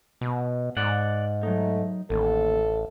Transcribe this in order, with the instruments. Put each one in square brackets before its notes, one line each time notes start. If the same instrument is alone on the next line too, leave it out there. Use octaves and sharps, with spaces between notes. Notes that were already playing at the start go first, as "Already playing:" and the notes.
[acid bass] B2
[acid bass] G#2 [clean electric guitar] D5 F#5
[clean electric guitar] F#3 D#4 [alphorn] A3
[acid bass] A1 [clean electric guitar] D#2 [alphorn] A4